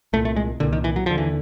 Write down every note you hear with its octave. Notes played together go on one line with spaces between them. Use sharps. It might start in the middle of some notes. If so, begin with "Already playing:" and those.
C2 A#2 A3
A3
G#3
C2 A#2 D3
D#3
E3
F#3
D#2 D3 F3
E3